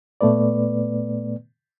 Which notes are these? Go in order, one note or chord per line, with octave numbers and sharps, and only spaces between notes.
A#2 A3 B3 B4 D5